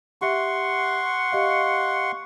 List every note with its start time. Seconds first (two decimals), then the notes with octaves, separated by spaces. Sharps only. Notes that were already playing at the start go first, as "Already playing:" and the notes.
0.22 G4 E5 F#5 C6 C#6
1.32 G4 D#5 F5